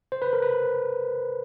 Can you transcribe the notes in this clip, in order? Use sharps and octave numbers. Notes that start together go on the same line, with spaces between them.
C5
B4
A#4
B4